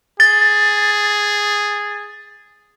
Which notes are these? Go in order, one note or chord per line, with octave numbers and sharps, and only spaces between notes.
G#4 A6